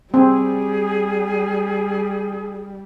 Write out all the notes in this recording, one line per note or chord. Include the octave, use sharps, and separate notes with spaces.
G3 C4 G#4